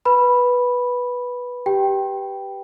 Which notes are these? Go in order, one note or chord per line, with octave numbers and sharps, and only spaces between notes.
B4 B5
G4 G5